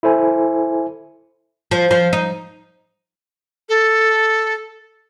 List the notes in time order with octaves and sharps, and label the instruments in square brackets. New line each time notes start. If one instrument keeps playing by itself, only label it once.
[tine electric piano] E4 A4 C5 G#5
[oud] F3
F3
D#4
[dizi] A4